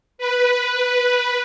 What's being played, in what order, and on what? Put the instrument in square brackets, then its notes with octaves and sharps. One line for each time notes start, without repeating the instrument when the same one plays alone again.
[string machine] B4